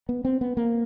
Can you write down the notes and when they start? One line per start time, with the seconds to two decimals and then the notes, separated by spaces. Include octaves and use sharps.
0.09 B3
0.25 C4
0.41 B3
0.57 A#3